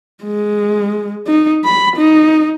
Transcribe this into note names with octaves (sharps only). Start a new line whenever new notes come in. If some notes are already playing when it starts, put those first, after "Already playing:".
G#3
D#4
B5
D#4